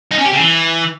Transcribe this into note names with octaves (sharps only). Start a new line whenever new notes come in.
D#4
C#4
G4
C#3
E3